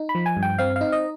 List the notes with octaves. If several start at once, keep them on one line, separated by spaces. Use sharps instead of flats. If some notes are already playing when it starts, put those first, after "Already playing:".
Already playing: D#4
B5
F3
G#5
G2
G5
C4 F5
D#4 F5
D#5